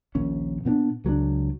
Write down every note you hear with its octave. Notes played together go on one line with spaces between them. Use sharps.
A#1 D#2 C#4
A#2 B3 C4 D4
C#2 F#3 A3 D4